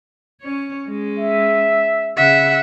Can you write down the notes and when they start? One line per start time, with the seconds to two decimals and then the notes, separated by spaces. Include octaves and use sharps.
0.41 C#4 C#5
0.88 G#3 C#4
1.19 E5
2.17 C#3 E5 F#5